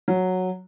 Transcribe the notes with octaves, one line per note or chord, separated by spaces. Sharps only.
F#3